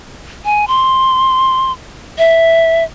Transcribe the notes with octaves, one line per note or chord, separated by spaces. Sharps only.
G#5
C6
E5